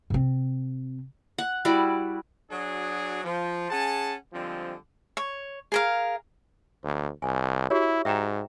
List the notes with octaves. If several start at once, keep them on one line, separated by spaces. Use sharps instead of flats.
C3 C4
F#5
G3 E4 F#4 D5
F#3 D4 F#4 G#4
F3
C#4 G#4 F#5 A5
D3 F3 G3 G#3 C4
C#5
G#4 A#4 F5
D2
C2 G#5
E4 F#4 G4 C#5
G#2 E5 G5 A#5